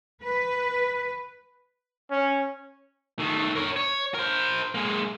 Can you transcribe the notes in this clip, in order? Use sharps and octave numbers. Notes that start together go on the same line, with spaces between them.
B4
C#4
D#3 A3
A#4 C#5
C#5
A#4 C5
G#3 A#3